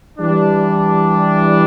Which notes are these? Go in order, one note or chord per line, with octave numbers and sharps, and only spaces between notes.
E3 G3 D4